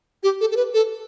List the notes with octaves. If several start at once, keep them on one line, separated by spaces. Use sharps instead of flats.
G4
A4
A4
B4
A4